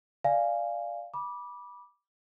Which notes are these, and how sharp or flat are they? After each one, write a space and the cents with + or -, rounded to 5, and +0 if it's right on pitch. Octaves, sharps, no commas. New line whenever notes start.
D5 +0 F5 -10 G#5 +0
B5 -20 D6 +0